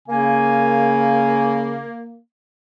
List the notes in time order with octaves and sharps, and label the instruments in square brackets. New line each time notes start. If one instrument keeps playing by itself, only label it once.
[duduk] C#3 [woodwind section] A#3 [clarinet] G#5